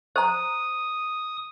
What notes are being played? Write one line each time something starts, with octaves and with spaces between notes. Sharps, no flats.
C5 A#5 D#6